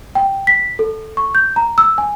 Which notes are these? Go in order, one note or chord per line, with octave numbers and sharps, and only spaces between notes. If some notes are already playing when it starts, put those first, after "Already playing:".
G5
B6
A4
C#6
G6
A#5
E6
G#5